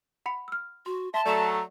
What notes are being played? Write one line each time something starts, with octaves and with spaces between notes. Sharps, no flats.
F#5 B5 C#7
E6 F6
F#4 C6
E5 A5 C6 B6
F#3 A3 D5 A#5 E7